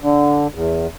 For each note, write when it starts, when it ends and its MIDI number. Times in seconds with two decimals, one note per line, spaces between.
0.01 0.47 50
0.55 0.87 40